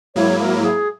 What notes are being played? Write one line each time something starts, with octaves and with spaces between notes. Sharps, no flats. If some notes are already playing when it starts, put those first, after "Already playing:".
G#2 F#3 A#3 E4 C#5
A#4
G#4